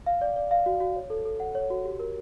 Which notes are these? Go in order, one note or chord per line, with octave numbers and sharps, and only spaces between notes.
F5
D5
D5
F5
F#4
F#4
C#5
A4
A4
F#5
C#5
F#4
G4
A#4